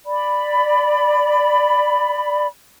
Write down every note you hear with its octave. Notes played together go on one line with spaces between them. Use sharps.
D5 B5